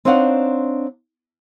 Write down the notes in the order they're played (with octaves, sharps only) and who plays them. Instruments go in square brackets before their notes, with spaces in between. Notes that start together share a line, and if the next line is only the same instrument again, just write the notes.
[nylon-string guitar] C4 D4 D#4 C#5 F5 F#5